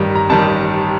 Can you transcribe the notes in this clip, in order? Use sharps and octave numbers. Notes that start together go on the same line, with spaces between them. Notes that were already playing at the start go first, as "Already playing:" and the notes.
Already playing: A1 G2 D#3 G3 A#5
A#5
A1 G2 D#3 G3 A5